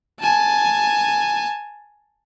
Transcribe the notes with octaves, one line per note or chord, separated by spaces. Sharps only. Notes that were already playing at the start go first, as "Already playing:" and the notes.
G#5 A5